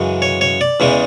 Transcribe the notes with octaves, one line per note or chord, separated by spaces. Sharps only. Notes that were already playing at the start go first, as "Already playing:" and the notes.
Already playing: F#2 C#3 E3 G#3
C#5
C#5
D5
E2 C#3 E3 G#3